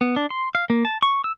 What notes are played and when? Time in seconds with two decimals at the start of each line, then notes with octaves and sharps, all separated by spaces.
0.01 B3
0.16 D4
0.30 C6
0.55 F5
0.70 A#3
0.85 A5
1.02 C#6
1.24 E6